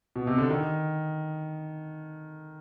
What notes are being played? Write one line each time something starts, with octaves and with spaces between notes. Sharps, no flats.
B2
C3
D3
D#3